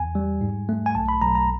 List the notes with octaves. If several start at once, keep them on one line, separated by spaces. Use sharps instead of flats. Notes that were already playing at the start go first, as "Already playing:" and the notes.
Already playing: E2 G#5
G3
G#2
A3
G#5
B1 A5
B5
B1 A#5
A#5